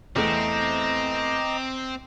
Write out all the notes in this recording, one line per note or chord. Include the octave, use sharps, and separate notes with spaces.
E2 A3 C4 D#5 A#5 D6